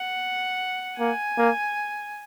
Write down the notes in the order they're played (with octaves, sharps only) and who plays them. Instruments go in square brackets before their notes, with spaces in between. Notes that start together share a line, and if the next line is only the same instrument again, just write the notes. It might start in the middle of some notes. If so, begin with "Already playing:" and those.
Already playing: [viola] F#5
[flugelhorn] A#3 [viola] G#5
[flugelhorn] A#3